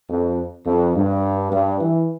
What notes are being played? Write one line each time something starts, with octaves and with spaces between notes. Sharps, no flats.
F2
F2
G2
G2
E3